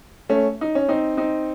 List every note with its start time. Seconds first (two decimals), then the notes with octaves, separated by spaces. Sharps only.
0.29 A3 C#4
0.61 D#4
0.75 C#4
0.88 C4 D#4
1.17 C4 D#4